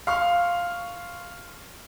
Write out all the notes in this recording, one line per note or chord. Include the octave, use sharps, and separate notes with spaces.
F5 C6 C#6 F6